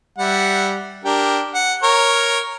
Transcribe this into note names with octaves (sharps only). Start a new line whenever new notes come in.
G3 E5 F#5
D4 G4 A#4
F#5
A#4 C#5